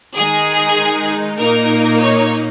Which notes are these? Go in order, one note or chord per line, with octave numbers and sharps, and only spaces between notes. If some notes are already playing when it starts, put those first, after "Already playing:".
D#3 G#3 D#4 G#4
A#2 A#3 D#4 A#4
C#5